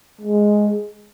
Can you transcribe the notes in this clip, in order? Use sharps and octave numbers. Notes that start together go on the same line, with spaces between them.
G#3